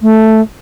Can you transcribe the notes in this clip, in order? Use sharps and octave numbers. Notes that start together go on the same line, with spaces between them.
A3